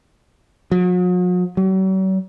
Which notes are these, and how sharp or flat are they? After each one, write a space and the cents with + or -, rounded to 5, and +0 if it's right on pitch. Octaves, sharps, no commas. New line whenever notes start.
F#3 -45
F#3 +45